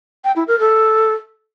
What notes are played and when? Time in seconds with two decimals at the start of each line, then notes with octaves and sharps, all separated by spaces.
0.24 G5
0.36 E4
0.48 A#4
0.60 A4